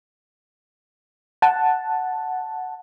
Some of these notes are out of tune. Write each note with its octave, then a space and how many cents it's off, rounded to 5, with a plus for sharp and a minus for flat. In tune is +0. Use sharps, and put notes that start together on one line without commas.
F#5 +0 A5 +0